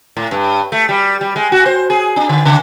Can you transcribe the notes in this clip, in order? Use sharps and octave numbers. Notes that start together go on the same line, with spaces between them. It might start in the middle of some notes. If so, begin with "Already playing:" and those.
A2
G2
A3
G3
G3
G#3
F#4
C5
G#4
D4
D3
C#3